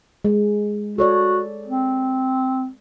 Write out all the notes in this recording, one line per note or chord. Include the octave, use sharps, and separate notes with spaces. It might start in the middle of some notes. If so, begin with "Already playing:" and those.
G#3
F#4 A4 C#5 D5
C4